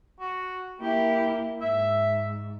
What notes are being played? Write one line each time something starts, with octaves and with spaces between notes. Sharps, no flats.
F#4
A#3 E4 G4
G#2 E5